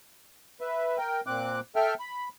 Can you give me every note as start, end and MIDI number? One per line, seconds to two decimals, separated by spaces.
0.61 0.98 71
0.61 0.98 76
0.98 1.21 70
0.98 1.21 79
1.27 1.60 46
1.27 1.60 60
1.27 1.60 86
1.27 1.60 90
1.76 1.94 69
1.76 1.94 76
1.76 1.94 79
1.76 1.94 89
2.00 2.29 83